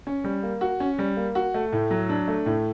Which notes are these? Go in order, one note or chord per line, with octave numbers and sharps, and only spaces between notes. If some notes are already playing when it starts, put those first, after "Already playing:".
C#4
G3
A#3
F#4
C#4
G3
A#3
F#4
A3
A2
F#3
D4
A3
A2